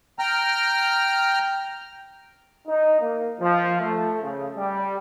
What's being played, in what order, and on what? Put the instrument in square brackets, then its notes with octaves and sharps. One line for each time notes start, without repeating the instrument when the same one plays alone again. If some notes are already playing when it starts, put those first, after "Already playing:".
[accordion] G5 A#5 F6
[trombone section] D#4
A#3
F3
A3
C#3
G3